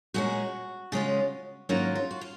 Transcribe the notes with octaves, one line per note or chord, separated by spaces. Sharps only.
A#2 G#3 C#4 F#4
C#3 G#3 C#4 F4
G#2 D#3 F#3 A#3 C#4 F4
F4
F#4
F4